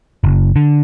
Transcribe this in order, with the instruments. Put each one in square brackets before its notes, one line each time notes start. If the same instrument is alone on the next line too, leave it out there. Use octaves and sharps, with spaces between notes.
[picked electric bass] F#1
D3